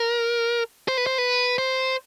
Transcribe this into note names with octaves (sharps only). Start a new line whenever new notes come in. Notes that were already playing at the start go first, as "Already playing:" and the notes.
Already playing: A#4
C5
B4
C5
B4
C5